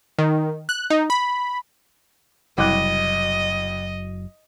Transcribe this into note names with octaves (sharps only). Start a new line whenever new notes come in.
D#3
F#6
D#4
B5
F#1 C2 F#3 D#5 D6 F#6